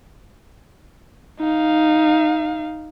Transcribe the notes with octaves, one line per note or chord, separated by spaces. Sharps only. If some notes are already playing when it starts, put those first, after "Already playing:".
D#4 F5